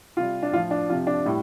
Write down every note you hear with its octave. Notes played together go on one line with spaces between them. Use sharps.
C3 G3 F4
D4
A2 F3 F4
D4
C3 F3 F4
D4
A2 G3